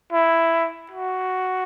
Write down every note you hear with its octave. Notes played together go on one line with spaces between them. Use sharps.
E4
F#4